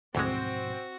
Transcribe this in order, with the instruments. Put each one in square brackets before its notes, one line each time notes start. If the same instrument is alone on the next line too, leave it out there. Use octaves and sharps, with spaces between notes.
[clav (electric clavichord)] D2 E3 G#3 [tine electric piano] G#2 B2 F3 [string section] C4 [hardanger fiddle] F#4